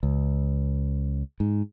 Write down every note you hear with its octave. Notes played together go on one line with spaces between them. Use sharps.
C#2
G#2